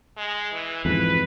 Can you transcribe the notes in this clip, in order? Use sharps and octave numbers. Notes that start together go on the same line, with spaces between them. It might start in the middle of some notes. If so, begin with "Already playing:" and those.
G#3
E3
F2 G#2 E3 B4